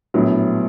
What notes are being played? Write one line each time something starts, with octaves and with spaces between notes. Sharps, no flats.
A#1 A2 F#3 B3